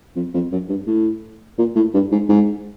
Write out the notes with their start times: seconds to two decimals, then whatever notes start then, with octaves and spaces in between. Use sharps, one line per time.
0.16 F2
0.34 F2
0.52 F#2
0.69 G2
0.87 A2
1.58 A#2
1.76 A2
1.94 G2
2.12 G#2
2.29 G#2